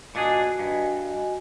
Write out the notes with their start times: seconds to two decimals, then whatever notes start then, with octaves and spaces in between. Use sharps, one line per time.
0.15 A#2 D4 F#4 G#4 D#5 G#5
0.59 G2